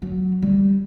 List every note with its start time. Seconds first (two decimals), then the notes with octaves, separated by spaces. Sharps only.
0.02 F#3
0.42 G3